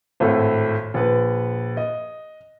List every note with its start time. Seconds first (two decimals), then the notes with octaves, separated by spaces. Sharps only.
0.20 G#1 A2 A4
0.94 A#1 B4
1.77 D#5